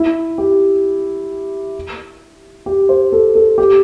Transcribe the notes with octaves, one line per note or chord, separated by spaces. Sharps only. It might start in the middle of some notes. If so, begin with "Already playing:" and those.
Already playing: E4
G4
G4
C5
A4
A4
G4